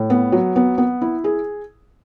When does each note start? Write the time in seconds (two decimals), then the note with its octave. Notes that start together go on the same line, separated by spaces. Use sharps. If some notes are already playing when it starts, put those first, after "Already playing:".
Already playing: A2
0.10 B3
0.32 F#3
0.56 B3
0.78 B3
1.01 E4
1.24 G#4